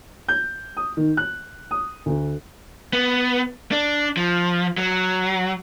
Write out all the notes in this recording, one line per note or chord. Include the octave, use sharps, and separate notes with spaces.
G6
D#6
D#3
F#6
D#6
D2
B3
D4
F3
F#3